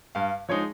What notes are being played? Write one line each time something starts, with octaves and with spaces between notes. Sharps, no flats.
G2 F5
F3 G#3 D#4 C#5